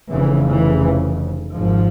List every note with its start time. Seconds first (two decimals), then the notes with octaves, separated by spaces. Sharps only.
0.10 F1 F2 C#3 E3
0.45 E3
1.53 G#1 G#2 F3